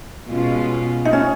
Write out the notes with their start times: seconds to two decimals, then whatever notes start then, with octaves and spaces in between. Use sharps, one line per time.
0.28 B2 G#3 C#4 F4
1.05 D#4
1.13 C#4